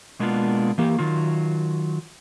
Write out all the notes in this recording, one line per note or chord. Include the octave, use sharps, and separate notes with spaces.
B2 G#3 A#3 B3 D4 F4
E3 A#3 G4
D#3 F#3 F4